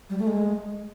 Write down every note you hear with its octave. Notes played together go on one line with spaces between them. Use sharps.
G3
A3
G#3